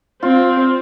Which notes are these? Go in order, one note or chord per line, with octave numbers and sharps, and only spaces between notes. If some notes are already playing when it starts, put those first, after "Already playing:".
C4 F4